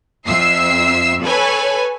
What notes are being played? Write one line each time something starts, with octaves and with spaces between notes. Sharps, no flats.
F2 E5 E6 C7
A4 B4 C#5 G#5